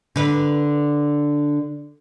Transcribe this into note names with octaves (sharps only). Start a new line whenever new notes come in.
D3 B4